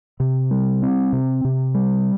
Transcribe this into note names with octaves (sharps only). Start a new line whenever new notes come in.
C3
G3
C4
C3
C3
G3